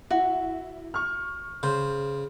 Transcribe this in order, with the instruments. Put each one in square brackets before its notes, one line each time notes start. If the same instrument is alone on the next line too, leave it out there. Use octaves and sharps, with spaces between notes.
[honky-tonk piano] E4 [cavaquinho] F#4
[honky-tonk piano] C#6 F6
[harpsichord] C#3 [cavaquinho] C5